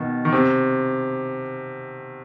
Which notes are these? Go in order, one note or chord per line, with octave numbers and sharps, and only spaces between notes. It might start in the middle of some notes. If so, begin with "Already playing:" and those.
Already playing: B2 D#3
D#3
C3